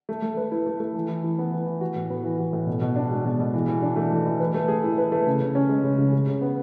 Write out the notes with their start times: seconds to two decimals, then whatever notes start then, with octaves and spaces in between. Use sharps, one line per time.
0.09 A3
0.22 A3
0.37 B4
0.51 E4
0.66 A3
0.80 A3
0.95 E3
1.09 E3
1.24 E4
1.38 B3
1.52 E3
1.66 E3
1.81 F#4
1.96 A2
2.10 B3
2.24 E3
2.39 F#4
2.53 A2
2.67 B2
2.81 B2
2.96 D4
3.10 G#3
3.25 B2
3.40 B2
3.54 E3
3.68 E3
3.82 D4
3.96 A3
4.12 E3
4.26 E3
4.40 B4
4.54 A3
4.68 G#4
4.84 E4
4.98 B4
5.12 A3
5.26 C#3
5.41 C#3
5.55 C#4
5.69 G#3
5.84 C#3
5.98 C#3
6.12 C#3
6.27 C#3
6.41 B3